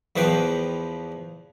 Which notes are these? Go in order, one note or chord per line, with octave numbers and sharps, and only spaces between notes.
E2 E3 F3 B4 G5